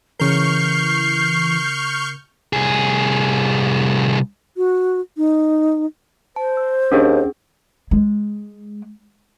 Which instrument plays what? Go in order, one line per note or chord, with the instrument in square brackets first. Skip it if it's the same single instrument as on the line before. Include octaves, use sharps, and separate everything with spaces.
[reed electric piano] C#3 A#4 [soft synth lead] E3 [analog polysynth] C#6 F6 G6 [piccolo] C7
[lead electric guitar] C2 G#4
[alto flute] F#4
D#4
[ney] C5 [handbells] A5
[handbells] E6
[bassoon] D#2 [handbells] C#4 D4 G#4
[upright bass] G#3